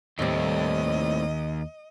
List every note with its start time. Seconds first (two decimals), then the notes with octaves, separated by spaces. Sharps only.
0.19 D#2 A2 G3 A3 C4 D#4 D#5